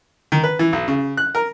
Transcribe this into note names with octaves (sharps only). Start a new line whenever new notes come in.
D#3
B4
E3
B1
C#3
F#6
A#4